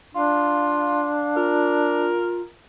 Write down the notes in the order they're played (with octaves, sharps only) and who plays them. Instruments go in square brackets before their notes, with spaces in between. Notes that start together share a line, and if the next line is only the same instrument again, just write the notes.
[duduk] D4 [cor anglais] F4 [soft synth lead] F5
[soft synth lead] F4 [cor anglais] A#4